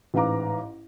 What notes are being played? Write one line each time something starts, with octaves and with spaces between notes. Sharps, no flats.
A1 G#2 B4 F5 A#5 D6